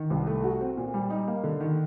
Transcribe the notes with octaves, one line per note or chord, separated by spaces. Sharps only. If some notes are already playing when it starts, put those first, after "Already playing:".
Already playing: D#3
C2
A3
F#4
C4
A#2
G3
D#4
A#3
D3
D#3